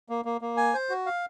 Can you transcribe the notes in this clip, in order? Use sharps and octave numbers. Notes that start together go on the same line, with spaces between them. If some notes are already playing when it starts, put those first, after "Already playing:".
A#3
A#3
A#3
G#5
C5
F#4
F5